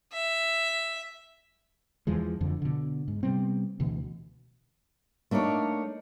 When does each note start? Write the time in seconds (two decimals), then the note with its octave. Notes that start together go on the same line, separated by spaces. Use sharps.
0.13 E5
2.07 E2 E3 F3 G#3
2.41 F2 D3 F3
2.62 B2 D3
3.08 G#2
3.23 C3 G3 B3 C4
3.80 D2 B2 E3
5.31 A3 A#3 D4 D#4 C#5